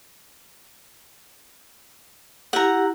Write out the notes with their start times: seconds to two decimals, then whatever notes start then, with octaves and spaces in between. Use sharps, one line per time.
2.53 E4 G4 F#5 A#5